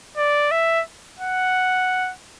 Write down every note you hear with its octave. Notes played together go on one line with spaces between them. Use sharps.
D5
E5
F#5